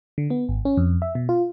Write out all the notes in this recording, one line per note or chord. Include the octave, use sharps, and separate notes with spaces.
D3
B3
G#1
C#4
F2
E5
B2
F4